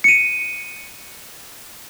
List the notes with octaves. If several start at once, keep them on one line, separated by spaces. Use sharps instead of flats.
C#7 D#7